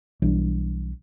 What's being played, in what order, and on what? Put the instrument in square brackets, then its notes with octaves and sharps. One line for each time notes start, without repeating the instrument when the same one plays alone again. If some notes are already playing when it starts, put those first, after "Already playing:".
[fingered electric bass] B1 E3 G3 D4